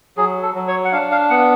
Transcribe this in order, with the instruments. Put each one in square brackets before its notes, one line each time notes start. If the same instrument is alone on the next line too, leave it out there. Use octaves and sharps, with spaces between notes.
[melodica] F#3 G#4
A4
F#3
C#5
F#5
D4 F5
F5
B3 F#5